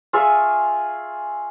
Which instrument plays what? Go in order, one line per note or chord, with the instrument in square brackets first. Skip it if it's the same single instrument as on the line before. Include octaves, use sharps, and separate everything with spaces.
[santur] F4 G#4 E5 C#6